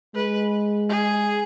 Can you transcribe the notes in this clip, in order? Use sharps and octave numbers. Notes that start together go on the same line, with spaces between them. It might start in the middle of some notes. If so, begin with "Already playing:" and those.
G#3 B4
G#4